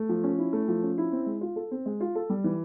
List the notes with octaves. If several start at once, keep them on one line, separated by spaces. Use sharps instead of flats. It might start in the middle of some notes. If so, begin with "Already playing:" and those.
Already playing: A3
F3
C#4
E4
A3
F3
C#4
E4
C4
G#3
F4
A4
C4
G#3
F4
A4
G3
E3